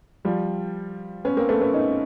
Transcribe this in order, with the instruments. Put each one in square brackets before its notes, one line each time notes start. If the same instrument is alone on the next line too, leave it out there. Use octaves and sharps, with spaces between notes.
[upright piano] F3 G3
B3 C#4
A#3 C4
A3 B3
B3 C#4
C#4 D#4